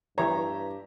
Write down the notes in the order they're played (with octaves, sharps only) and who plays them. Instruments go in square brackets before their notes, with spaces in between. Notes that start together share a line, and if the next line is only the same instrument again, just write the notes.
[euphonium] G2 [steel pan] E3 C#5 [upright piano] G4 E5 A#5